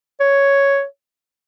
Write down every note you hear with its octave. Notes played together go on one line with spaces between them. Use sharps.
C#5